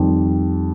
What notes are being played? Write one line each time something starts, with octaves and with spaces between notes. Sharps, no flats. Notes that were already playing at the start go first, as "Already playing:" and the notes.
Already playing: F2 D#3 G3